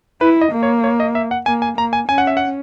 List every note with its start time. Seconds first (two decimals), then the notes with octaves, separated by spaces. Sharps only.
0.21 E4 B4
0.41 D#5
0.52 A#3
0.63 C#5
0.84 C#5
1.00 D#5
1.15 E5
1.31 F#5
1.46 A#3 G#5
1.62 G#5
1.77 A#3 A#5
1.93 G#5
2.09 C#4 G#5
2.18 F#5
2.27 E5
2.37 F#5